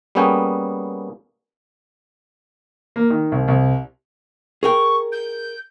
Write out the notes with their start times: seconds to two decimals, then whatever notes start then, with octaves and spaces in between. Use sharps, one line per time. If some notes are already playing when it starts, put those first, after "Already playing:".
0.15 G3 A#3 B3 C#4 G#4 G5
2.96 A#3
3.10 D#3
3.32 C2
3.48 C2
4.63 G#4 A#4 G5 C#6
5.12 G6